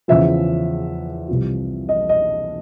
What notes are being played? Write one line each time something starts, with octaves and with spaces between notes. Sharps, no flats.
E2 C#3 F3 E5
C2 C3 F3
D#5
D#5